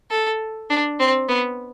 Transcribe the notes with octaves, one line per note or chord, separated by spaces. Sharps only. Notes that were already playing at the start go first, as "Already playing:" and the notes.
A4
D4
C4
B3